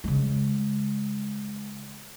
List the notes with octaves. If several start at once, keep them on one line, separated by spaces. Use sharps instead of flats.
C#3 G#3